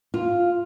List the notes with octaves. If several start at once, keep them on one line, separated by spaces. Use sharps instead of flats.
F4